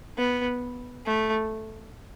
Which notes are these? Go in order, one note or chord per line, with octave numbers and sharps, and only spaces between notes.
B3
A3